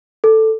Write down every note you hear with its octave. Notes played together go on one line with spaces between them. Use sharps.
A4